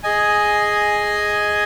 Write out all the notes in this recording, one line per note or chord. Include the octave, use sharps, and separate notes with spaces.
G#4 D#5 G#5